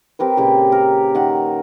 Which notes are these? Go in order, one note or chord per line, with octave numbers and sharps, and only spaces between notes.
C4 G4 A#4 B4
A#2 C#3 G4
A#4
D#3 F#5